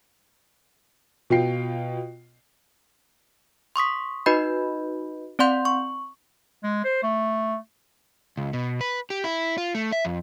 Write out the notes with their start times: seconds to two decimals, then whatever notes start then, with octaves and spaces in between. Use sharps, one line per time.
1.30 B2 F4 G5 C7
3.76 C6 C#6 D#6 B6
4.26 D#4 F#4 B4 D#5 B5 G6
5.39 C4 D5 F#5 C6 G6
5.65 C#6
6.63 G#3
6.84 C5
7.03 A3
8.37 C#2
8.53 B2
8.81 B4
9.10 G4
9.24 E4
9.58 F4
9.75 A3
9.92 E5
10.05 F2